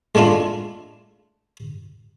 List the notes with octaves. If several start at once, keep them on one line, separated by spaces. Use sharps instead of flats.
G#3 A3 D4 E4 F4